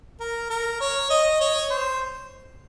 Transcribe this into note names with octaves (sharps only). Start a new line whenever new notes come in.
A#4
A#4
C#5
D#5
C#5
C5